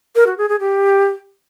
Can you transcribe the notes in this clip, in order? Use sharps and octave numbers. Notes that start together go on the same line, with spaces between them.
A#4
F#4
G#4
G#4
G4